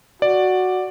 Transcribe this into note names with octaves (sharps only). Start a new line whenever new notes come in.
F#4 D5